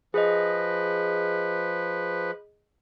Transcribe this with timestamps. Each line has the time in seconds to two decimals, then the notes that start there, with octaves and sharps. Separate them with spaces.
0.14 F3 G#4 B4 D#5